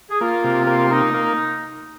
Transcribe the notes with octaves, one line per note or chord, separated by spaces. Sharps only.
G#4
A#3 F4
C3
A#3
A#3 D#4
A#3